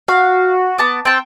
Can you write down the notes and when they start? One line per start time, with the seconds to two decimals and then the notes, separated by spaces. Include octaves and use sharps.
0.08 F#4 F5
0.78 B3 A5 D6
1.05 C4 G5 A5